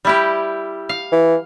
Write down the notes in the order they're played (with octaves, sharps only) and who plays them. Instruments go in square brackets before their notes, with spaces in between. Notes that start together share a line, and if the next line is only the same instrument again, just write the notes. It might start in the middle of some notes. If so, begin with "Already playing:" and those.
[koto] G3 E4 G4
F5
[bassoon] E3